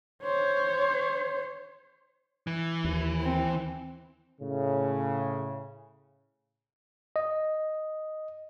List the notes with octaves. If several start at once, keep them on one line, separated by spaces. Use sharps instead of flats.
C5 C#5
E3
D#2
C4
A2 C#3
D#5